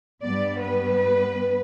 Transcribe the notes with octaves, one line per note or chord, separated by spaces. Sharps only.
G2 G3 B3 D5
B4